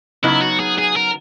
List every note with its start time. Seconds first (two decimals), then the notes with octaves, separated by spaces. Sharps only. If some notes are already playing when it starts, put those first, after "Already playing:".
0.23 C#3 F#3 B3 D#4 E4
0.41 F#4
0.59 G#4
0.78 G#4
0.96 A#4